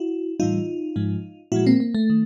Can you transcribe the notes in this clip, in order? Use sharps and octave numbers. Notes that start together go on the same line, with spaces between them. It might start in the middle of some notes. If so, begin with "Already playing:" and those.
Already playing: E4 F#4
A2 E3 G3 D#4 F4
G#2 F3 G#3
A#2 F3 G#3 E4 F#4
A#3 C4
A#3
A3
D#3